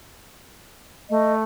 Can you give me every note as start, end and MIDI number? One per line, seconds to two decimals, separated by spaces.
1.10 1.43 57
1.10 1.33 75